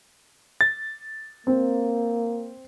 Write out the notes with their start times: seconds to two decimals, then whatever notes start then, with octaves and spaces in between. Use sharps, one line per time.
0.61 A6
1.47 A#3 C4